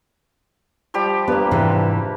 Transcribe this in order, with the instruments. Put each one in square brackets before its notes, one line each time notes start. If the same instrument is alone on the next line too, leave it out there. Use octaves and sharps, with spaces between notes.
[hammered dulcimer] F3 G3 G4
[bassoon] G2 [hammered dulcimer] A#3 B4 [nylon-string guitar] B3
[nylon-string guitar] G#2 C3 E3